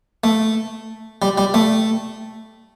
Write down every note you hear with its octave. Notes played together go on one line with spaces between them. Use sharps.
A3
G3
G3
A3